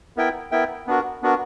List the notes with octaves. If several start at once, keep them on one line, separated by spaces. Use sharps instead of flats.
B3 E4 A#4 E5 G5
B3 E4 A#4 E5 G5
B3 D4 F#4 A#4
B3 D4 F#4 A#4